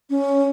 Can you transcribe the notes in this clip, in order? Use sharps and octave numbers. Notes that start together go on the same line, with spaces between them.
C#4